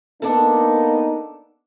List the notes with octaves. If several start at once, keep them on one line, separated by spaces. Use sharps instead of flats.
A#3 B3 D4 D#4 A4